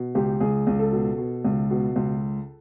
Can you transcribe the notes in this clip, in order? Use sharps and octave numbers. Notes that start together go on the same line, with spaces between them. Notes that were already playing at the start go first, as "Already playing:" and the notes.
Already playing: B2
C#2 G4
C#2 G#4
C#2
A4
B2
B2
C#2
B2
C#2